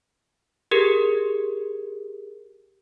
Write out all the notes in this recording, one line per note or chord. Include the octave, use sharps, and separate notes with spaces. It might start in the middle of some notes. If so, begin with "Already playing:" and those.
G4 G#4 A#4